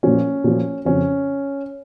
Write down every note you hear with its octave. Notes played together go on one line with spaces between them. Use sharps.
A#2 F3 C#4
A#2 F3
F2 C#3 F3 C#4